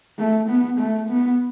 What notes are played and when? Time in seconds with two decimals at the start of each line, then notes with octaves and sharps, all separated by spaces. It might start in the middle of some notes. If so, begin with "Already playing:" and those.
0.19 A3
0.48 B3
0.79 A3
1.09 B3